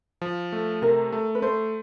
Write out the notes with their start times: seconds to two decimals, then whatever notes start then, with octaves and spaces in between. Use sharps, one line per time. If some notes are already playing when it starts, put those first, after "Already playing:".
0.21 F3
0.52 A3
0.82 C3 A#4
1.12 A3
1.35 B4
1.42 A3 C5